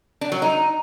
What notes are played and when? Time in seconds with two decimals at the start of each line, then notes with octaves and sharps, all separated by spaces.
0.21 D4
0.32 F#3
0.42 D#4